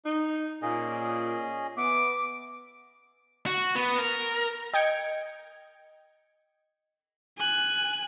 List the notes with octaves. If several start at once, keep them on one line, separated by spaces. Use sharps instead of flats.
D#4
A#2 C#4 G#4 D#5
B3 E5 D6
F#4
B3
A#4
D#5 G5 G6 G#6 C#7 D7
G#5 F#6